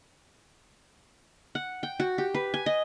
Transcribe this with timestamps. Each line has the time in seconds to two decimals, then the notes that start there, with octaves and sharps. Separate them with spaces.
1.55 F#5
1.83 G5
2.00 F#4
2.18 G4
2.35 B4
2.54 G#5
2.66 D#5